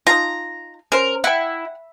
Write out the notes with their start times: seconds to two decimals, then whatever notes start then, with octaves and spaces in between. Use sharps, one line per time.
0.07 D#4 F4 A#5
0.92 C#4 A#4 C5
1.24 E4 F#5 G5